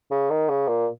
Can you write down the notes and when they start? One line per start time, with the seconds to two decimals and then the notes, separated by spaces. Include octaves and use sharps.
0.11 C#3
0.30 D#3
0.49 C#3
0.68 A#2